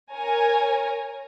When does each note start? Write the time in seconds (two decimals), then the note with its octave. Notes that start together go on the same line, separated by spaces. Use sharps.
0.13 A#4 C#5 G#5 A#5